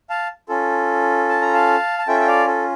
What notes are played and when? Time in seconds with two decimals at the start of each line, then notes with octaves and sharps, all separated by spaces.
0.10 F5 A5
0.49 C#4 F4 A4
1.29 A5
1.42 A#5
1.54 F5 A5
1.99 A5
2.08 C#4 F4 A4 E5 G5
2.20 G5
2.27 D5 F5
2.47 A4